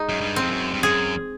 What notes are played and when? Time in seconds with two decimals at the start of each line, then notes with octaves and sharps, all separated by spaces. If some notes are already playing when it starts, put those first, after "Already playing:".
Already playing: G#3 D#4
0.09 F#2
0.21 G2
0.36 C4
0.41 F2
0.51 F#2
0.74 G2
0.83 F#2 G#4